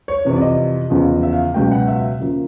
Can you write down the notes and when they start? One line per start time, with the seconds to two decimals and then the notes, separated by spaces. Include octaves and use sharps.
0.08 C#5
0.25 F2 C3 E3
0.36 D5
0.41 D#5
0.90 E2 C#3 F3
1.23 E5
1.33 F5
1.54 C#2 B2 F#3 B3 G5
1.72 F#5
1.88 E5
2.20 C#3 F3 A#3